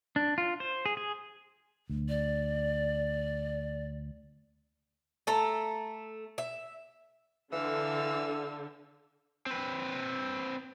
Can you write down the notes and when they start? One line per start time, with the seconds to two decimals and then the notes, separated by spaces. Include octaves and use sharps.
0.16 D4
0.38 F4
0.60 C5
0.86 G#4
0.97 G#4
1.90 D2
2.09 D5
5.27 A3 A4 A#5
6.38 E5
7.52 D3 E3 F5 E6
9.46 C4 B4